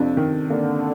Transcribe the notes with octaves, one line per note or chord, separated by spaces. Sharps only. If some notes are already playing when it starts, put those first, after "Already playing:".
Already playing: F2 C3 D4
D#3
D3 A#3